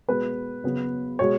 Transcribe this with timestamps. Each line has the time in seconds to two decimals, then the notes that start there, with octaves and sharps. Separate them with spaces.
0.08 B2 G#3 B3 B4
0.64 C#3 F#3 B3
1.19 B2 G#3 C#5